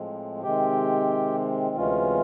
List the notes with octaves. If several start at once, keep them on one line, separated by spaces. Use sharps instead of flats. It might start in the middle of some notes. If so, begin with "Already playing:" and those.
Already playing: A2 F3 G#3 C4
C3 D#3 G#3 C4 G4
D2 C3 E3 G#3 C#4 F4